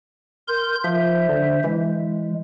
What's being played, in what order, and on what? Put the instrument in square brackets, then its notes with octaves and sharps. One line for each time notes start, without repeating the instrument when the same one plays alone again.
[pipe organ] A#4 C6 G6
[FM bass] F3 [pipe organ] C5 E5
[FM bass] D3
[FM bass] E3 [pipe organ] G#3